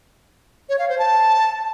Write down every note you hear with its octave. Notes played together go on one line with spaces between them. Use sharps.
C#5
F5
C5
A5